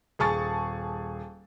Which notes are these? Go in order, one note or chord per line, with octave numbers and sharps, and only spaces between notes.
D#1 G#4 A5 C#6 A6